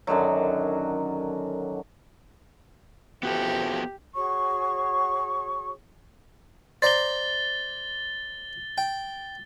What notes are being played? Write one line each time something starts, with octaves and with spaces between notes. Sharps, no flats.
F#2 D3 D#3 F#3
C#3 E3 F3 B3 F#4 G4 A4
F#4 G#4 C#5 C#6
C5 D5 A#5 A6 G7
G5